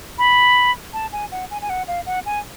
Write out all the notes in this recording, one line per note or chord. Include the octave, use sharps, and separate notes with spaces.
B5
A5
G#5
F#5
G#5
G#5
F#5
F5
F#5
G#5